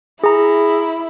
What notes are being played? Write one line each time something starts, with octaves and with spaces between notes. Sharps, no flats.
E4 G#4 A#5